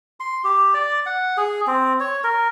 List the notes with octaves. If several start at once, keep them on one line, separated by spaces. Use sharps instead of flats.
C6
G4
D5
F#5
G#4
C4
C#5
A#4